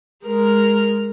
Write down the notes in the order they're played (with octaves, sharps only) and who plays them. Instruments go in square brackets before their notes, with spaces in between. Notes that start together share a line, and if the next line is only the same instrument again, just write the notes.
[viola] G#3 A#4